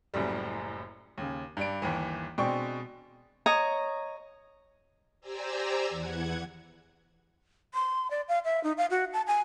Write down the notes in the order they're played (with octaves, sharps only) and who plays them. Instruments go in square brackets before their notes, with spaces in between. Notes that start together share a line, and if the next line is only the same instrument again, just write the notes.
[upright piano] F#1 F#2 A2 G3
D#2 C#3
G2 D4 D7
G1 D#2 E3
B2 G#3 C4 D4 G5 C#6
[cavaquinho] C#5 D#5 A#5 D#6
[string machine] G4 C5 D5 G#5 A#5 E6
E2 E3 F#5 G#6
[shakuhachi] C6
D5
F5
E5
D#4
F5
F#4
A5
G#5